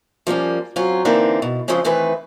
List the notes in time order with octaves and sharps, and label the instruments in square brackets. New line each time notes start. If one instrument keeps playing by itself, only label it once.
[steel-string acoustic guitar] F3 G3 A#3 C#4
F#3 C4 C#4 F4
D3 E3 A#3 C4 D4 D#4
B2
C#3 F3 G#3 C4 C#4
D#3 E3 A3 C4 B4